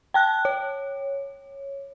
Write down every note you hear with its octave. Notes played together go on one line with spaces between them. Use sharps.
G5 A5 F#6
C#5